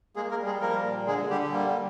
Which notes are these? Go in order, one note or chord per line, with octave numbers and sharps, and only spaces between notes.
G#3 A#3 G#4
A#3 A#4
G3
G#3 G#4
F3 A#3 A#4
A#2
D3 G#3 G#4
D3 G3 G4
G3 A#3